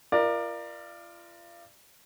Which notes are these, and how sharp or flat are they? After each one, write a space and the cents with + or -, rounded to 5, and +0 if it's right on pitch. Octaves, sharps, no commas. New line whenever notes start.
F4 -35 A#4 +10 D5 +25